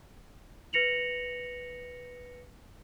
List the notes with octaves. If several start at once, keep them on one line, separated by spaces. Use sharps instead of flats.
B4 A#6 C#7 F7 F#7